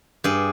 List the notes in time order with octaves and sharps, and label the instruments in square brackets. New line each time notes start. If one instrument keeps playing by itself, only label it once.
[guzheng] G2 G#4